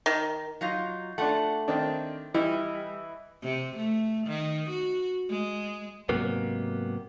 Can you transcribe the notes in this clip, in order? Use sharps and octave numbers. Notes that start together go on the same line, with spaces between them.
D#3
F#3 D#4 F4
A3 D4 F4 F#5
D#3 C4 D4
E3 G3 E4 D#5
C3
A3
D#3
F#4
G#3
G#2 C3 F#3 A#3 B3